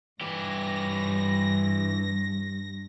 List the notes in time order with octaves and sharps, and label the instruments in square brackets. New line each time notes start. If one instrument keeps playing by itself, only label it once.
[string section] G2 A#6 [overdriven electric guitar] E3 G4